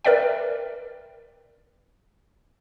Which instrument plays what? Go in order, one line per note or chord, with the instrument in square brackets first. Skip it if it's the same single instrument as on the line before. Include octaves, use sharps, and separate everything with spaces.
[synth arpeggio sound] A#4 B4 D5 E5 G5